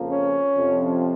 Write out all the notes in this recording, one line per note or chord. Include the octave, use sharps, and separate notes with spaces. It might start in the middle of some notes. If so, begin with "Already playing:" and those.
Already playing: F2 C#3 F3 A#3
C#4
F2 C3 F3